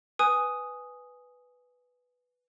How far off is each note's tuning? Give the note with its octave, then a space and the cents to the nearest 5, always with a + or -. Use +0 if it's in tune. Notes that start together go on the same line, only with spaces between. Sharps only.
B4 +0 G#5 +0 D#6 +0